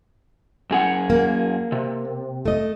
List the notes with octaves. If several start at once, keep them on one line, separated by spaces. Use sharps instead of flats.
F#2 G#4 F#5
A#3
C3
A3 D#5